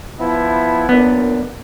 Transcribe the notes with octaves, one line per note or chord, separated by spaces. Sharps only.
F3 B3 E4
F#2 A#2 B3 D4